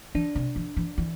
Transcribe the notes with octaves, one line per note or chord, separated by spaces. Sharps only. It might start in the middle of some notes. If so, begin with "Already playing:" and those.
E3 D4
C3
E3
E3
E3